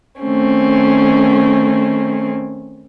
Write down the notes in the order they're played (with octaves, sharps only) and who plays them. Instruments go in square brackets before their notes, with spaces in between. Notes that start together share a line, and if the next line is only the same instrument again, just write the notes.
[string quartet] D#3 A3 C4 C#4